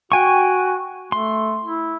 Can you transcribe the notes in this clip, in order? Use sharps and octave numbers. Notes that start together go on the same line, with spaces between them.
F#4 G5 G#5 C#6
A3 C6
E4